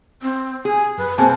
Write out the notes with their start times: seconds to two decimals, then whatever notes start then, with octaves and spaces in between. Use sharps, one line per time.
0.22 C4
0.65 G#4 G#5
0.98 F#2 B4
1.18 B2 A#3 C4 G#4 C5 G#5 A5